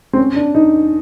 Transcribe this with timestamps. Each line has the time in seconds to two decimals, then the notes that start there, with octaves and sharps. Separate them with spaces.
0.13 C4
0.18 C#4
0.36 D4
0.55 D#4